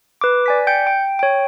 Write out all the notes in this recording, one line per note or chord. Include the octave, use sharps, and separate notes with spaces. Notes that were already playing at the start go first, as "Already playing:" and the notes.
B4 D6
D5 G#5 B6
G5 G6 C#7
G5
C#5 G5